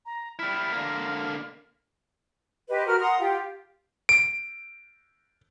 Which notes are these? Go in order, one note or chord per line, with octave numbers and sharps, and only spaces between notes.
A#5
G3 E4 F6
D3 A#3
G4 B4 C5 D#5
F#4 A#4 F6
F#5 A#5 C6 D#6
F4 G4 G5
D7